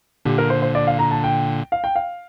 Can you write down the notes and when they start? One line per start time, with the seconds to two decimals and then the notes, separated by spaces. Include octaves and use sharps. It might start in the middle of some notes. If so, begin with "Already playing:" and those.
0.25 A#2 D3 G4
0.38 A#4
0.50 C5
0.62 C5
0.75 D5
0.87 F5
0.99 A#5
1.11 A5
1.24 G5
1.72 F5
1.84 G5
1.96 F5